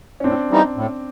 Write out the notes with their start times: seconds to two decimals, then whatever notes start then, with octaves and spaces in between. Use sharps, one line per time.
0.20 C#4
0.24 A2 C4 D4
0.50 E3 G3 B3 D#4
0.77 A2